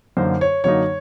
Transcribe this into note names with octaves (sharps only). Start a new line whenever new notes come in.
F#2 D3 F#3 A#3 D#4 C5
C#5
F#2 D3 F#3 A#3 D#4 C#5